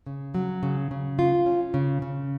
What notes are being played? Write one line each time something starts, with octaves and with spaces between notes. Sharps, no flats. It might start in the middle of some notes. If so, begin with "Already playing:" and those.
C#3
F#3
C#3
C#3
F4
C#4
C#3
C#3